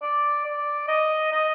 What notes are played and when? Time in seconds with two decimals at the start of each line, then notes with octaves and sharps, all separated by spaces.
0.02 D5
0.45 D5
0.88 D#5
1.32 D#5